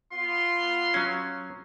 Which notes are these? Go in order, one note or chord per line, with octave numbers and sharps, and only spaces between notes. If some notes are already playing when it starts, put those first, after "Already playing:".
B3 F4 C6
F#3 C#4